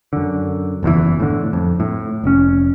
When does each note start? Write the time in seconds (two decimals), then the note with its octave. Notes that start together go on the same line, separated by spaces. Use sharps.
0.13 F#2 D3
0.83 F#1 E2 B2 E3
1.20 A2 D3
1.53 F2
1.80 A2
2.24 F1 C#4